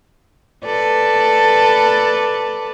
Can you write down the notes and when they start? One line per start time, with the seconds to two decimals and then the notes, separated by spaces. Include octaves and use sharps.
0.65 A4 B4 D5